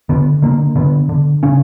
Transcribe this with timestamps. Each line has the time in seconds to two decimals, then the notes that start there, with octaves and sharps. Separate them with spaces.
0.09 D3 B3
0.42 D3 A#3
0.76 D3 B3
1.09 D3
1.43 C#3 C#4